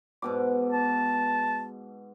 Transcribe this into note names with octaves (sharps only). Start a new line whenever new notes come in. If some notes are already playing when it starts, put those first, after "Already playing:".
G#2 B2 D6
A5